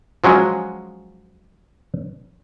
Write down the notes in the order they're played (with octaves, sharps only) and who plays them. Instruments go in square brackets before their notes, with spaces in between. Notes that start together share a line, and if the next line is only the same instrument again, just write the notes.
[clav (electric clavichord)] F3 F#3 G#3 C#4